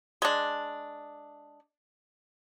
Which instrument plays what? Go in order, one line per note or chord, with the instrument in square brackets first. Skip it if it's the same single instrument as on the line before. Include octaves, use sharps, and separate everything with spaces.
[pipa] G#3 D4